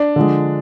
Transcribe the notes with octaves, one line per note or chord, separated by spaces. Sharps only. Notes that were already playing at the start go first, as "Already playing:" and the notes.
Already playing: D4
D3 F3 G#3